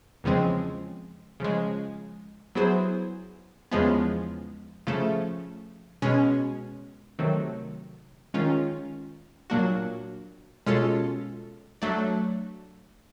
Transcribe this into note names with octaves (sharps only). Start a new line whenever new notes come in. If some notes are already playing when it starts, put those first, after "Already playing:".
E2 C#3 F3 G#3 C4
C#3 F3 G#3
F#3 B3 E4 G#4 C5
E2 C#3 F3 G#3 B3
C#3 F3 A3
B2 G#3 C#4
C3 D#3 F#3 A3
D#3 G#3 C#4 F4
A#2 F#3 A#3 D4 F#4
B2 G#3 C#4 F4 A4
F#3 A3 D4